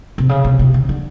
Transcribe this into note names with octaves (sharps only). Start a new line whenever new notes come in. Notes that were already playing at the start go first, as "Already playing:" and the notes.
C3
C#3
C3
C3
C#3
D3